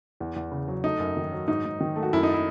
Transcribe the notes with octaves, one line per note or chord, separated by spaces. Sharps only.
E2
E2
C#3
F#3
A3 D#4
F#2
D#3
F#3
G#2 D#4
G#2
D#3
A3
F#4
F#2 E4
D#4
E4